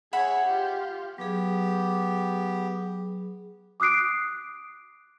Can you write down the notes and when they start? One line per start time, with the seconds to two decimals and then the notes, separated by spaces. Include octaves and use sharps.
0.13 G#4 C#5 E5 F#5 B5
0.46 F4 G4
1.18 F#3 B3 G4 G#4
3.80 D6 D#6 F#6 C7 D7